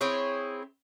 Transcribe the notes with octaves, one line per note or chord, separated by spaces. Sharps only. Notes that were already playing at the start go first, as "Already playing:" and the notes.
C4 E4 G#4 C#5